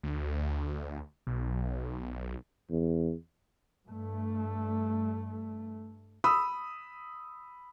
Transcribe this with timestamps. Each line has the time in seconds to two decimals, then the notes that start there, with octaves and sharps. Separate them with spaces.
0.03 D2
1.27 B1
2.70 E2
3.87 G2 A3
6.24 B5 D#6 E6